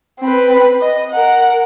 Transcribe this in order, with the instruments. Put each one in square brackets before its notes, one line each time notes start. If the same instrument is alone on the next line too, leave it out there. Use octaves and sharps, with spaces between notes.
[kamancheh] C4 B4
D#5
A#4 F#5